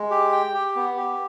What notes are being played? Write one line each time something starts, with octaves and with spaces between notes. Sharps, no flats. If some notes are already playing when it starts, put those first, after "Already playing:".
Already playing: G#3
G4
G5
G4
B3
G4